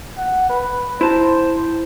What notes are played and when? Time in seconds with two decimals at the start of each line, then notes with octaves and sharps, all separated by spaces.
0.18 F#5
0.50 B4
1.01 E4 C5 A5 A#5